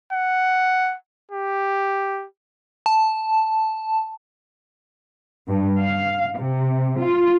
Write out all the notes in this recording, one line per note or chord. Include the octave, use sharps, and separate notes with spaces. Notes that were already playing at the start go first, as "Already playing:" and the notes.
F#5
G4
A5
G2
F5
C3
F4